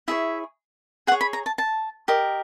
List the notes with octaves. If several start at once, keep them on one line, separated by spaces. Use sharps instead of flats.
E4 G#4 C#5 E5
G#4 C#5 F#5
B5
A#5
A5
A5
G4 A#4 D#5